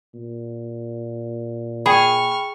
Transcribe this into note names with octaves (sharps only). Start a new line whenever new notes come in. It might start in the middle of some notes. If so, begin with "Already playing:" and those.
A#2
G#4 G5 B5 C#6 F6